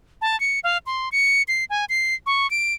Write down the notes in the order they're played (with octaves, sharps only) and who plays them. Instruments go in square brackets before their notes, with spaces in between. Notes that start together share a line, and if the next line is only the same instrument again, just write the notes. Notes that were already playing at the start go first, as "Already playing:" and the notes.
[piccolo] A5
C#7
F5
C6
C#7
C7
G#5
C7
C#6
D7